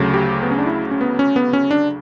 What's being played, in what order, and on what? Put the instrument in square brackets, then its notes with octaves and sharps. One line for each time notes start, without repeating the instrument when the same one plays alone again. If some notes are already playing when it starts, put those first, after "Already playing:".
Already playing: [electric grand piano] D2 C#3 F#3 A3
G4
B3
C#4
D4
E4
C#4
B3
C#4
B3
C#4
D4